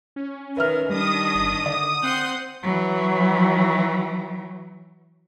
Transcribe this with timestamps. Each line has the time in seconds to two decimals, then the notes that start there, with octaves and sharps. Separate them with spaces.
0.16 C#4
0.57 D#3 A#4 B4 E5 F6
0.89 D#3 G3 D4 D#6
1.35 G1
1.66 D3 D5
2.03 C4 F#5 C6 G6
2.63 E3 F#3